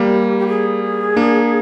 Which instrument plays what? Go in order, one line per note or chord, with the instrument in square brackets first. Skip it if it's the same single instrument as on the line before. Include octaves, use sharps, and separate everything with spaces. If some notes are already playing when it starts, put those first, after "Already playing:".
Already playing: [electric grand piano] G3 A#3
[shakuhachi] G4
G4
G#4
[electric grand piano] A#3 D4